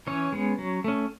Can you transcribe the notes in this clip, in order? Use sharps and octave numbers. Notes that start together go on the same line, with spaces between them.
E3 C#4 C#5
G#3 B3
F#3
A3 C#4